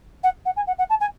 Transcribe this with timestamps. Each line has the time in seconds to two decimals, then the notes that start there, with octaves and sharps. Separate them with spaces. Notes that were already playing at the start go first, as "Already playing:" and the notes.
0.23 F#5
0.45 F#5
0.56 G#5
0.67 F#5
0.78 F#5
0.90 A5
1.00 G#5